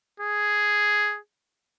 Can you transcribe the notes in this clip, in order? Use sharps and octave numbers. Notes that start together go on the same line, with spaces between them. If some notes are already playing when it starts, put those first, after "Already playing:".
G#4